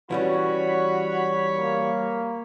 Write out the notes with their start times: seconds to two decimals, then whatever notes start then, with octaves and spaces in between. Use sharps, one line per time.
0.11 E3 G3 C#4 F#4 C#5 B5
1.56 A#3